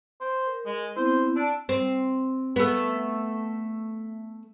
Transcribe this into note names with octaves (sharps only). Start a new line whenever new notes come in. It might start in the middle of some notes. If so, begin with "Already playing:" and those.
C5
A#4
G#3
B3 C4 E4 C5
D4 A5 E6
C4
A3 B3